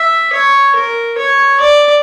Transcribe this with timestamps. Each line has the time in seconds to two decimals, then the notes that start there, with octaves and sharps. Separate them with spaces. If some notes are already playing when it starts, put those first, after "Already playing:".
Already playing: E5
0.32 C#5
0.75 A#4
1.18 C#5
1.60 D5